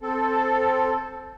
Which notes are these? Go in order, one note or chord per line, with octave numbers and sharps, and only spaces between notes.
C4 A4